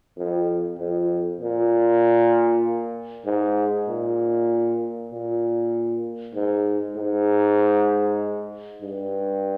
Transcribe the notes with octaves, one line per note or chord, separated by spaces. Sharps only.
F2
F2
A#2
G#2
A#2
A#2
G#2
G#2
G2